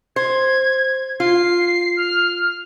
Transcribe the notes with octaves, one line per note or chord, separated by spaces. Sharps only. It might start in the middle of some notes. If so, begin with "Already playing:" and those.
C5 G#6
F4 C7
F6